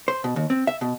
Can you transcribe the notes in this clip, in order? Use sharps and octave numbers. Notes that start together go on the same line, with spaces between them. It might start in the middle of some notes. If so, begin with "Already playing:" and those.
C5
B2
D#2
C4
E5
B2